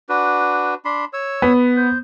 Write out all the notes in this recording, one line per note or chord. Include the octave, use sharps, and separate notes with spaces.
D4 F#4 B4
D4 B5 C6
C#5 E6
B3
C5